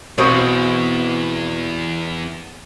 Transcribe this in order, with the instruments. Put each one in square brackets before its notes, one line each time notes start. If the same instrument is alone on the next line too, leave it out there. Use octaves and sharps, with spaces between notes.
[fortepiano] B1 C5 D#6 [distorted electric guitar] E2 [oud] B2 C4 F#4